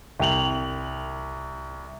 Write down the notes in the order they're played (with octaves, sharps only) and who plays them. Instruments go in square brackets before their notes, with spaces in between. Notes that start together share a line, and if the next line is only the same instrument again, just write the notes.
[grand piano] C2 G5 F7 F#7